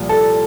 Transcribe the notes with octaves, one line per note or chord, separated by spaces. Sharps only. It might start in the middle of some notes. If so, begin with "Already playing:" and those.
Already playing: C2 A#2 F3
A4